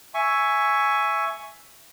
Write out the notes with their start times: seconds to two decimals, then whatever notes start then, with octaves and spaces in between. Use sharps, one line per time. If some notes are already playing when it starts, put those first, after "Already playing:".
0.14 E5 G#5 C#6